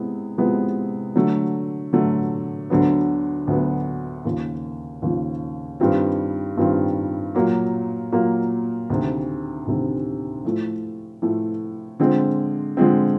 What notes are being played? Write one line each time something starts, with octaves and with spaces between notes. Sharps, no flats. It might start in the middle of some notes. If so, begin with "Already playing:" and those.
Already playing: C3 G#3 B3 E4
C3 F3 G#3 B3 E4
D3 F#3 A3
D3 F#3 A3
D2 D3 F#3 B3
D2 D3 F#3 B3
D#2 C#3 F3
D#2 C#3 F3
G2 D#3 G3 C4 F4
G2 D#3 G3 C4 F4
A#2 F#3 A#3
A#2 F#3 A#3
D2 C3 D#3
D2 C3 D#3
A2 F3 A3
A2 F3 A3
D3 F3 G#3 C4
D3 F3 G#3 C4